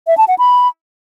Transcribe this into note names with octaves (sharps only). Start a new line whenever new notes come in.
E5
A5
F#5
B5